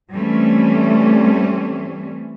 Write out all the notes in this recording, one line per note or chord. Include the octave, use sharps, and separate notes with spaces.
E3 G3 A3 C4 C#4